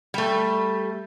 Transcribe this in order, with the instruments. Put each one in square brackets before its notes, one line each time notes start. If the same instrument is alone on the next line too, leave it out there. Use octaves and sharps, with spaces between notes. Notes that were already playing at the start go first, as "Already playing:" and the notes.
[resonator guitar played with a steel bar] G3 A3